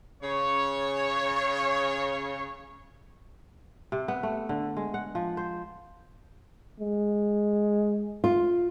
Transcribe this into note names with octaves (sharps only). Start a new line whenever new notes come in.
C#3 C#5
C3
B3
A3
D3
G#3
F#5
F3
C5
G#3
F4